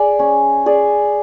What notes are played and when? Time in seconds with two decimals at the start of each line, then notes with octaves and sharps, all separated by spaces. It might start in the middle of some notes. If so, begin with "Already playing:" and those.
Already playing: G#4 D5
0.19 C#4
0.66 G#4 D5